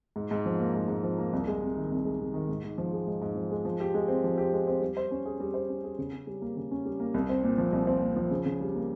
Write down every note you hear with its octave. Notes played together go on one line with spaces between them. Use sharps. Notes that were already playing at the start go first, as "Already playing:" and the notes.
G#2
G#2
F3
A#3
G#2
G#2
F3
A#3
C2
G#3
C3
D#3
C2
G#3
C3
D#3
G#2
G#2
F3
G#3
G#2
G#2
F3
G#3
F3
G4
G#3
C4
F3
G4
G#3
C4
G3
C5
C#4
G#4
G3
C5
C#4
G#4
C#3
C#4
G3
A#3
C#3
C#4
G3
A#3
C2
C4
A#2
F3
C2
C4
A#2
F3
C#3
C#3
G3
A#3